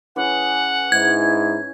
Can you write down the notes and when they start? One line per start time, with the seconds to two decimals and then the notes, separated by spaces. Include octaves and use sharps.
0.16 E3 C#4 G#4 F#5
0.92 G#2 E4 G#6